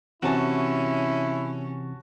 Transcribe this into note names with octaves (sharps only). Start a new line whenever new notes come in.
C3 E3 C#4 E4 F#4 G#5 A5